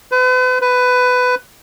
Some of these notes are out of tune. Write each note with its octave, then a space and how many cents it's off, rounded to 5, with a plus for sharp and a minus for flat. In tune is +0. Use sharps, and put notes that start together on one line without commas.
B4 +40
B4 +15